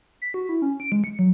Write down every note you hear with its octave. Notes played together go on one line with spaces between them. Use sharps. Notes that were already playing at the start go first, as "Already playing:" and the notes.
B6
F#4
E4
C#4
D7
G#3
C#7
F#3